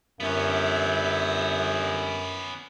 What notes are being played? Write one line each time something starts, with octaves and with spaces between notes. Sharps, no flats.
G1 F#2 B3 C#4 E5